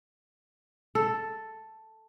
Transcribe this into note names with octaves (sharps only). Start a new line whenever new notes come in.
A4